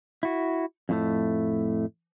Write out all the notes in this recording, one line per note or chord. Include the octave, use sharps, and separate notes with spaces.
E4 F#4
F2 A2 A3